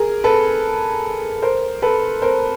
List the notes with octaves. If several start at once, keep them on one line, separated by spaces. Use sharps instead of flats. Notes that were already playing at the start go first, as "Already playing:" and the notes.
Already playing: G#4 A#4
A4 B4
A#4 C5
A4 B4
A#4 C5